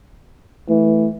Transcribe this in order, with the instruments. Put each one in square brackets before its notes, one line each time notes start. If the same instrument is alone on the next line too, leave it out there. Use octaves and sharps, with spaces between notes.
[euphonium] E3 [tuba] A3